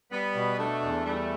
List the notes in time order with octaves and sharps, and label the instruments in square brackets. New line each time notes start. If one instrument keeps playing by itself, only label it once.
[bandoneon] G3 [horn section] B3
[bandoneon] B2
[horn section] A3 [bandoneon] D4
[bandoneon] E2
[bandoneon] G3 [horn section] A3